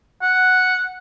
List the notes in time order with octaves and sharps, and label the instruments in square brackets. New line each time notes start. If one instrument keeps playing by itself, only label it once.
[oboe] F#5